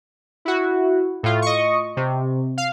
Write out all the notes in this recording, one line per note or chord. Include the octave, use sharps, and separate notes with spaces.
E4 F#4
A2 F4
D#5 C#6
C3
F5